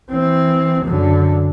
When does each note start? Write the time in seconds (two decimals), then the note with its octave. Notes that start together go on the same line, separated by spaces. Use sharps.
0.11 E3 C4
0.84 F#2 D3